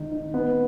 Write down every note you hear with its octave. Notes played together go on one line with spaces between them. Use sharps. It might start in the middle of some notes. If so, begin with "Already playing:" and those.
Already playing: D#3 G#3 D#4
D#4
B3